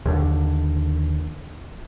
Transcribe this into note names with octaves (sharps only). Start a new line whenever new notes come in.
D#2 D3